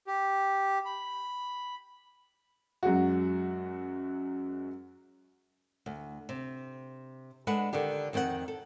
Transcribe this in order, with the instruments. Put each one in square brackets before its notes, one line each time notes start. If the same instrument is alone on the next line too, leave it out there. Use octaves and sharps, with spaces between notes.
[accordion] G4
B5
[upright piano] F#2 F#3 G#3 F#4
[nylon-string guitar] D2
C3
G#3 D4 A4 B4 F#5
D3 D#3 D4 G4
F2 D#3 C4 G#4 F#5
A4